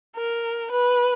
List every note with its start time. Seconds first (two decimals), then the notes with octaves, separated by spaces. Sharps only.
0.16 A#4
0.72 B4